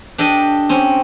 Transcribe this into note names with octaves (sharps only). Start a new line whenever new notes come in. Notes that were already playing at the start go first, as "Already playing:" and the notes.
D4 G4 A4 D#5
C4 C#4